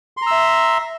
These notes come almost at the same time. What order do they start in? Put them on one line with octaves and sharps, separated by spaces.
C6 A#5 E6 E5